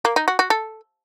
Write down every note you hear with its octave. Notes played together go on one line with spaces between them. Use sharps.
A#3
D#4
F#4
F#4
A4